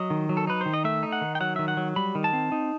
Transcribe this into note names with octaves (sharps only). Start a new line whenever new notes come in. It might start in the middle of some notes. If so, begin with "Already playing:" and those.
Already playing: F#3 D#5
D#3
F#3
A4
D#4 B4
D#3 C5
D#5
A3 E5
D#4
F#5
D#3
G5
F#3 F#5
D#3 E5
F#5
F#3
G3 B5
D#3
A5
C4
D#4